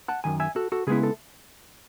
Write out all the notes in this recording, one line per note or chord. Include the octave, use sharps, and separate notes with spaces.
F#5 A5
F#2 D#3 G#5
E5 G#5
F#4 A4
F#4 A4
C#3 G#3 B3 E4 G#4
A4